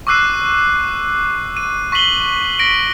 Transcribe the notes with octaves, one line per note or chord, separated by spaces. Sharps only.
C#6 D6 E6 F#6 C7 D#7
D#7
C#6 B6 C7 F#7 G7
A#6 B6 D7